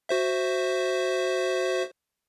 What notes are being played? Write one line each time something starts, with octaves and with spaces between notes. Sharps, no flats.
F#4 C5 E5